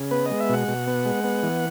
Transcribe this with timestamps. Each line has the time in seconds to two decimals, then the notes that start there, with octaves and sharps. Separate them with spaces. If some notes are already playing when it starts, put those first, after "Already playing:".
Already playing: C#3
0.11 B3 B4
0.26 G#3 D#5
0.40 E5
0.49 B2 F#5
0.68 B2
0.87 B3
1.05 G#3
1.24 B3
1.43 E3